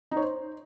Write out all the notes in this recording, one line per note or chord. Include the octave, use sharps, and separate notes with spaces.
D#4
C#5
C5